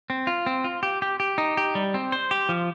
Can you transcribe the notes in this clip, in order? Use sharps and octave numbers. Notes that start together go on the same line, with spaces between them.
C4
F4
C4
F4
G4
G4
G4
D#4
G4
G3
C4
C5
G4
F3